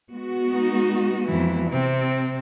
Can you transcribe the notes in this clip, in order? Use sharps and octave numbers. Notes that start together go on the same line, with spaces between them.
G#3 B3 F#4
D#4
F2 E3
C3 C4